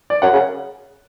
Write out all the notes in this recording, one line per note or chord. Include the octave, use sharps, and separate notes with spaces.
D5
F#2 F#5
C#3